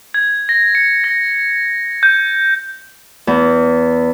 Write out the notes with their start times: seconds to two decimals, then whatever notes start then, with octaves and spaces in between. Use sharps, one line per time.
0.14 G#6
0.49 A#6
0.75 C#7
1.04 A#6
2.03 G6
3.27 E2